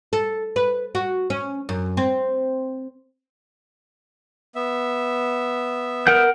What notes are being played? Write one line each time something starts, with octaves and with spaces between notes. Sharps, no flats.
A4
B4
F#4
C#4
F#2
C4
B3 E5
A#4 F#5 G6